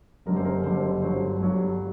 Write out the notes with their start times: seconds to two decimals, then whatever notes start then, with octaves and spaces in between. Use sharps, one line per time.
0.26 F#1 F#2 D3 G3 A#4
0.36 C5
0.45 A#4
0.64 F#1 F#2 D3 G3 C5
1.02 G1 G2 F#3 C5
1.40 G1 G2 F#3